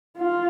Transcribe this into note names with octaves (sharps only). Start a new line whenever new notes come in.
F4